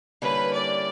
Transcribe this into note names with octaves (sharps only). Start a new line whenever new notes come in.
D3 G3 A#3 C#4 E4 B4
D5